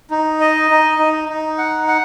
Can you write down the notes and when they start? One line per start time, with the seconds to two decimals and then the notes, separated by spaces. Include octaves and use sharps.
0.11 D#4
0.41 D#5
0.71 D#4
0.99 D#4
1.29 D#4
1.58 F#5
1.87 F#5